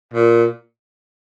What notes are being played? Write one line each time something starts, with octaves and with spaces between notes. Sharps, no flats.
A#2